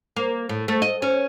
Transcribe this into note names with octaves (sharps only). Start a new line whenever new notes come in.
A#3
A2
A3
D#5
C#4